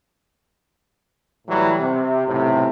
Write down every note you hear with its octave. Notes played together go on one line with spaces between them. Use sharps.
A2 E3 F#3 G3
C3
B1 A2 C3